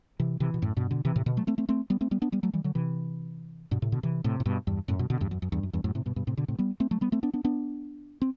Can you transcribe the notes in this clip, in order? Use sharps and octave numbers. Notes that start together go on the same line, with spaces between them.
C3 E3
C3 E3
B2
F#2 A2
G2 B2
B2 D3
C3 E3
A2 C3
B2 D3
F#3 A3
A3 C4
A3 C4
A3 C4
G3 B3
A3 C4
G3 B3
B3 D4
G3 B3
F#3 A3
E3 G3
D3 F#3
C3 E3
G2 B2
A2 C3
B2 D3
C3 E3
A2 C3
A2
G2 B2
E2 G2
F#2 A2
G2 B2
B2 D3
E2 G2
F#2
F#2
E2 G2
F#2
E2 G2
F#2 A2
A2 C3
G2 B2
G2 B2
A2 C3
B2 D3
A2 C3
G3 B3
A3 C4
F#3 A3
G3 B3
A3 C4
B3 D4
B3 D4
B3 D4
C4